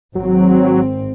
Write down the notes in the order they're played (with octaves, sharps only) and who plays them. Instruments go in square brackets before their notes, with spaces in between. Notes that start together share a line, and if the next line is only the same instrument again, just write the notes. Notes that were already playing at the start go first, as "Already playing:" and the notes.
[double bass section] G#1 C4 [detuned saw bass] F#3